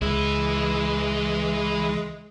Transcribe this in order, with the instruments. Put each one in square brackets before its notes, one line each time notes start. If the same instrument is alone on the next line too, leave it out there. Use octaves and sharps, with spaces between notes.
[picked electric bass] C#2 [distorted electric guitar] E3 E4 [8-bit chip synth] G#3